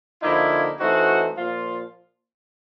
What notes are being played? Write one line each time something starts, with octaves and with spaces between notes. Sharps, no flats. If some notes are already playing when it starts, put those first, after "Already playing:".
D3 F3 A#3 D#4 E4
E3 A3 C4 D#4 F#4
A#2 F3 F4